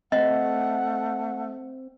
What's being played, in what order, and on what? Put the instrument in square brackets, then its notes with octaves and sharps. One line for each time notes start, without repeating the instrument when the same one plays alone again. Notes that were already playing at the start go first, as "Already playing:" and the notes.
[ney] A3 [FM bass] C4 [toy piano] D#5 [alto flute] F#5